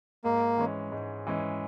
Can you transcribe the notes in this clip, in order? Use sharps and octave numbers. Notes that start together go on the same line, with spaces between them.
G#2 A#3
E3 G#3 C#4
G#2
E3 G#3 C#4